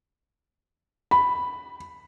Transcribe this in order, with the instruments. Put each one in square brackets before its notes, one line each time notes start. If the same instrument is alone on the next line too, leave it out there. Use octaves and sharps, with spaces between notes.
[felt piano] B5